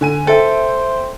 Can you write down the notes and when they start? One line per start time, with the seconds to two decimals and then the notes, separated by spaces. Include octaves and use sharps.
0.01 D3 G#5 D#7
0.27 A4 C5 E5 G5